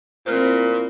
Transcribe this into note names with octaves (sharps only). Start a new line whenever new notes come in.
A#2 C4 E4 C5 F6